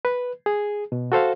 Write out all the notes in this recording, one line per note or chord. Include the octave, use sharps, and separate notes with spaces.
B4
G#4
B2
F#4 A4 C5 F5